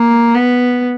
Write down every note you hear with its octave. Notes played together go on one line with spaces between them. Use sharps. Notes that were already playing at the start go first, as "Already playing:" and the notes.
Already playing: A#3
B3